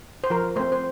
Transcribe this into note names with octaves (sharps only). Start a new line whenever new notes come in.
C5
F3 A#4
A3 C4 C5
C5